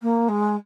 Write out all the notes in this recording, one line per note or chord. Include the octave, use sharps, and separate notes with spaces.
A#3
G#3